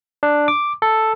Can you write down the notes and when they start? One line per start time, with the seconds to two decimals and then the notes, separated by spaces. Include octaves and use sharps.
0.23 D4
0.48 D6
0.82 A4